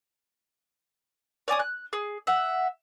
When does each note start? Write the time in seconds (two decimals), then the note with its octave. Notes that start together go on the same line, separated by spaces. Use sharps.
1.48 C#5 D5 G#5 D#6
1.59 F#6
1.93 G#4
2.27 E5 F#5